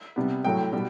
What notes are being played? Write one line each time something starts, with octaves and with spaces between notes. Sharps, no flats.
C3 G3 B3
A2 F#3 A3 G5
B2 G3 B3